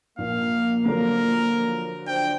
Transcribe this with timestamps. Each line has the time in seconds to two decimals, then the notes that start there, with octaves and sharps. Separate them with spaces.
0.18 A#1 A#3 F5
0.86 D3 F3 F#3 A#4
2.07 D4 C5 G5